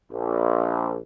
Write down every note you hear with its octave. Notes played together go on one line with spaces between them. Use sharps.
A#1